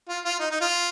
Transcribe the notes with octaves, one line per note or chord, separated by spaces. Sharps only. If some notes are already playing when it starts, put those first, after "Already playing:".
F4
F4
D#4
D#4
F4